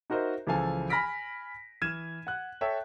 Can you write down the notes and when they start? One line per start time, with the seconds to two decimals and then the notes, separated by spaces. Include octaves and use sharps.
0.10 D#4 F#4 A#4 C5 D#5 E5
0.47 C#2 E3 F3 A4 F5 G#5
0.90 G#5 B5 F6 A#6 B6 D7
1.82 E3 F6 G#6 D#7 E7
2.27 F#5 F#6
2.61 A4 C#5 E5 G5